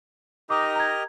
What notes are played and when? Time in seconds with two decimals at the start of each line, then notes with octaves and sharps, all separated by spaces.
0.50 D#4 G4 A#4 D#5 D6
0.76 A#5 G#6